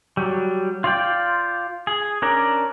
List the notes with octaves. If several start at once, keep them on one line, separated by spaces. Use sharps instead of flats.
F#3 G3
F4 D5 G5
G#4
C#4 D4 A#4 D5